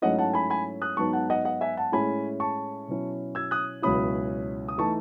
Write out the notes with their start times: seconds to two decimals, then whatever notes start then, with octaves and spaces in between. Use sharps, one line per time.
0.02 G#2 F#3 A3 C#4 E4 D#5 F#5
0.18 F#5 A5
0.34 G#5 B5
0.50 G#5 B5
0.82 D#6 F#6
0.97 G#2 F#3 B3 D#4 A5 C#6
1.13 F#5 A5
1.30 D#5 F#5
1.45 D#5 F#5
1.61 E5 G#5
1.77 F#5 A5
1.92 A2 G#3 C#4 E4 G#5 B5
2.40 A5 C#6
2.88 B2 F#3 C#4 E4
3.35 E6 G#6
3.51 D#6 F#6
3.82 C#2 B2 F#3 C#4 E4 B5 D#6
4.69 D#6
4.78 E3 A3 D#4 A5 C#6